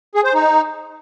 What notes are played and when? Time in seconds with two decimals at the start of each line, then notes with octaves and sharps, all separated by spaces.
0.15 G#4
0.25 C5
0.34 D#4